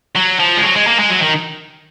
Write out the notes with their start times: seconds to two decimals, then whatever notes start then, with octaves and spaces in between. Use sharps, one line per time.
0.16 F#3
0.40 F3
0.57 G#3
0.63 F#3
0.75 G#3
0.87 A#3
0.99 G#3
1.10 F#3
1.22 D#3